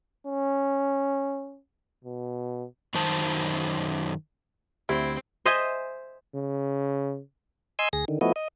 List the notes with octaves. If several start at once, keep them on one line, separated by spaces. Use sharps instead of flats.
C#4
B2
F#2 D#3 D#4 C5 A5
D2 C4 E4 G4
C5 D#5 E5 G#5
C#3
D#5 G#5 C6 E6
D2 G#4 A#6
D3 D#3
F3 A3 B3 E4 F#4 D#5
D#5